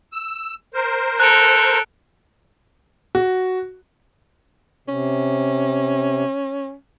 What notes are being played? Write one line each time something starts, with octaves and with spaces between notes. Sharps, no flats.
E6
A#4 C5
A4 A#5 F#6 D7
F#4
C3 C#4